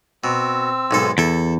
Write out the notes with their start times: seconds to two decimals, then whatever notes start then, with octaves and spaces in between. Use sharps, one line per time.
0.24 B2 C4 E6
0.91 B1 G#2 A4
1.18 E2 E4 A4